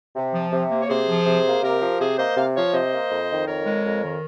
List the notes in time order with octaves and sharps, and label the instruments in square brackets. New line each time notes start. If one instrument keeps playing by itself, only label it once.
[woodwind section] C3
F3
C3
A#3
C#5
C3 G#4 C5
F3
C3
A#3
C3 G4 A#4
F3
C3 G#4 C5
A#3 C5 D#5
C3 F5
F3 C#5 F5
C3 C5 D#5
A#3
F2
D#3
F2 A#4 C#5
G#3
F2
D#3